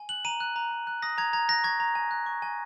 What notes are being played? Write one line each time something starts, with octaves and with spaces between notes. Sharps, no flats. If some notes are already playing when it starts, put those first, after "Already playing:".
Already playing: G#5
F#6 F#7
A#5 D#7
F#6
A#5
A#5
F#6
D#6 A#6
A#5 G#6
A#5 G#6
F#6 A#6
C#6 G#6
A#5
G#5
F#6
C#6
G#5